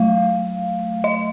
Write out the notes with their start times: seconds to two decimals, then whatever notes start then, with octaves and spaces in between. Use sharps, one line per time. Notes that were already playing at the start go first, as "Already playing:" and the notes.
Already playing: F#3 A3 F5
1.04 D#5